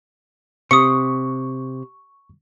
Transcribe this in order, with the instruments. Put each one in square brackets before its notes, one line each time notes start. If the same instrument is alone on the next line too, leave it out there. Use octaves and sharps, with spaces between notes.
[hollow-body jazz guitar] C3 [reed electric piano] C#6 [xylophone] D#6 C#7